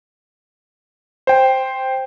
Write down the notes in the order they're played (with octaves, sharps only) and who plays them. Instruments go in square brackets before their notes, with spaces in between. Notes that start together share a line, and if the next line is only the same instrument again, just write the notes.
[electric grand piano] C5 G5